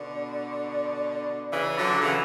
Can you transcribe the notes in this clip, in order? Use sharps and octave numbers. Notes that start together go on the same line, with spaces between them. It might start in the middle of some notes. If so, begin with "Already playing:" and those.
Already playing: B2 D3 D5
D5
C#3 E3
D3 F#3
C#3 E3